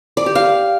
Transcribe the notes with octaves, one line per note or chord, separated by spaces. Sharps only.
D5
G4
F5